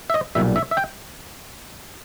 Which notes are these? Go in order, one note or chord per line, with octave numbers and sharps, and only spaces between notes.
E5
D#5
B1 A#2 G3 E5
E5
E5
G5